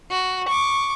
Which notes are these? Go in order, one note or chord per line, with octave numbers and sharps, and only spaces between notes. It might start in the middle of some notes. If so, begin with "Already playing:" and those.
F#4
C#6 D6